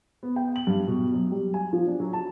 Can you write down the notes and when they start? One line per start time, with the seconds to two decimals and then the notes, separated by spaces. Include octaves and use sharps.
0.23 B3
0.36 G5
0.56 F#7
0.67 G2
0.87 B2
1.13 F#2
1.31 G3
1.54 G#5
1.73 F3
1.87 D4
2.00 F#3
2.13 A5